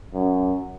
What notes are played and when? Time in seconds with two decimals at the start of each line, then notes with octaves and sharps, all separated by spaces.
0.14 F#2